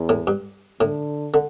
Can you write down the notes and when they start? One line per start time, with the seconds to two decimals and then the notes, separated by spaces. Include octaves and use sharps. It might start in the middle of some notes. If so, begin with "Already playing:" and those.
Already playing: E2
0.09 A2
0.27 G2
0.81 A2 D3
1.34 D3